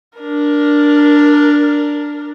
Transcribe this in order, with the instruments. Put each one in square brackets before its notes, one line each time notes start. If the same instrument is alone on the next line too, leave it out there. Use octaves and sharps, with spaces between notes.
[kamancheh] D4 A#4